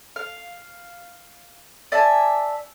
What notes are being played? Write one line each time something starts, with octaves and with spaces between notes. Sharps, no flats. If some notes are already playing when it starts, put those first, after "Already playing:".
F5
D5 E5 G#5 A5